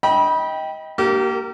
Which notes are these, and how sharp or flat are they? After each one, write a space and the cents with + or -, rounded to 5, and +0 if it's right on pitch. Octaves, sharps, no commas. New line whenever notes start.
D#5 +25 G5 +0 B5 -25
A#3 +0 G4 -30 A#4 -35